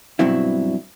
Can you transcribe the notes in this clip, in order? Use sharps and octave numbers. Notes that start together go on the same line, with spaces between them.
G2 B2 F#3 C4 E4